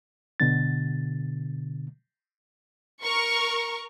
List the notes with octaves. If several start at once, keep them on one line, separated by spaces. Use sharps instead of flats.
B2 D3 A6
A#4 C#6